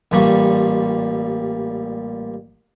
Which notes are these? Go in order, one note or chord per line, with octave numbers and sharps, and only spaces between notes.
A1 A#2 G3 C#6